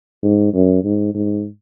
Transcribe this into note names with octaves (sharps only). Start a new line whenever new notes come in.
G#2
F#2
G#2
G#2